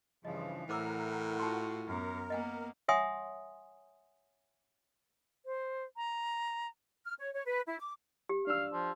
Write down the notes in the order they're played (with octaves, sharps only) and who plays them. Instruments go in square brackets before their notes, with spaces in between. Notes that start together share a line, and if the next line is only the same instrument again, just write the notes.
[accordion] G2 C#3 F3 [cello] E3 [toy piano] D#5
[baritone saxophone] A2 [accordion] A#4 F#5 [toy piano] C5 D6 E6
[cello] F4 F#4 [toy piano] A5 C6
[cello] F#2 B3 [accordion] A#4
[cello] A#3 B3 [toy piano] D#5 F#5 G#5
[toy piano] C#5 E5 F#5 G#5 C6 D#6
[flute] C5
A#5
[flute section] F6
C#5
C#5
B4
E4
D6
[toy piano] G4
[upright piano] D4 E6 [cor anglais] F5
[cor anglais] F3